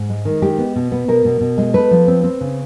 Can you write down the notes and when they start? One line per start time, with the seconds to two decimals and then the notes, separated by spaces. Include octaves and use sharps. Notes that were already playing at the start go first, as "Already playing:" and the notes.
Already playing: G#2
0.10 G#3
0.25 D#3
0.42 G#3 G4
0.58 B3
0.76 B2
0.92 B3
1.08 B2 A#4
1.25 B2
1.41 B2
1.58 G#3
1.74 A3 B4
1.91 F3
2.08 C4
2.24 C4
2.41 C#3